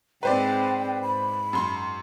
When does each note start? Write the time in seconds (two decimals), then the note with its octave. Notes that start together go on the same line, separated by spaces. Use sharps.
0.23 G#2 G#3 C4 B4 C5 D5 G5
1.03 G#2 B5
1.53 F#2 C6